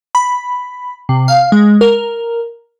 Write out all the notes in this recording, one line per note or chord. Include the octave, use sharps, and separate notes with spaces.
B5
C3
F5
G#3
A#4